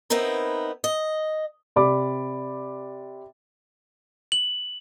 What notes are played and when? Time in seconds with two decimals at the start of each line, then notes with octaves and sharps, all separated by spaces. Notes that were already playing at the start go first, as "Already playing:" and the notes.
0.10 B3 C4 D#4 E4 A#4
0.84 D#5
1.76 C3 D5 B5 D6
4.32 F#7